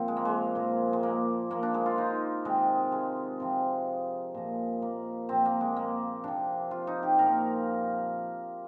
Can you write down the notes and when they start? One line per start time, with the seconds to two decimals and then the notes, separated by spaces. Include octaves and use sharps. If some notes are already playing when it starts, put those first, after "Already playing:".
Already playing: A#2 F3 C4
0.08 G#3
0.17 A#3
0.25 G#3
0.55 A#2 F3
0.93 G#3
1.03 A#3
1.50 A#2 F3 A#3
1.63 D4
1.74 G#3
1.86 F4
1.98 D#4
2.45 C3 D#3 G#3
2.92 G#3
3.40 C3 F3
4.35 A#2 F3
4.82 A#3
5.29 A#2 F3 C4
5.45 A#3
5.61 G#3
5.76 A#3
6.24 C3 F3 D4
6.71 F4
6.87 D#4
7.03 G4
7.19 A#2 F3 A#4